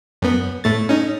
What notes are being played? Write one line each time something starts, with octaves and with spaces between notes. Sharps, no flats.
F#2 B3
A2 A3 A6
C#4 D#4